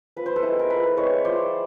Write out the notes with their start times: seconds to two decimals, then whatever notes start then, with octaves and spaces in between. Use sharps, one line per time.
0.16 F3 B4
0.26 C5
0.36 A4 B4
0.43 G#3 C4 E4
0.59 A#4
0.70 F3 A4 B4
0.97 G#3 C4 E4 B4 C#5
1.24 F3 C5 D5